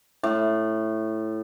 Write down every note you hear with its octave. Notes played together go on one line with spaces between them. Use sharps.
A2